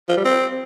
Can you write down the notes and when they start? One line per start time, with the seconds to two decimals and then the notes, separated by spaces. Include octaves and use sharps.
0.09 F3
0.17 G3
0.25 C4